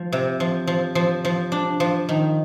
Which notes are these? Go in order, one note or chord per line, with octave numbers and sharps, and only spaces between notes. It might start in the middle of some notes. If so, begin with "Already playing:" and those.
Already playing: F3
C3
F3
F3
F3
F3
D4
F3
D#3